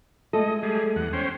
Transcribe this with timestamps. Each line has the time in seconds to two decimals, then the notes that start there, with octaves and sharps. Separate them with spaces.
0.33 G#3 A3 A4 D#5
0.63 G3 G#4
0.96 E2 F#5
1.13 C#4 C5 G5